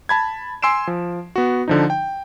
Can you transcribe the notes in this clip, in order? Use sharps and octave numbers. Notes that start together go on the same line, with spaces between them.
A5 B5 G#6
G#5 C6 E6 C7 D7 E7
F3
B3 F#4
D3 F3 D#4
G5